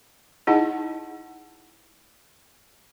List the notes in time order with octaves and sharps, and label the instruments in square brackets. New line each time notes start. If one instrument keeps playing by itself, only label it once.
[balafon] D#4 E4 G#4 D#5 F#5 A5